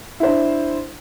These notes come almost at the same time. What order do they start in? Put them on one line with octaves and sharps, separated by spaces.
E4 C5 D4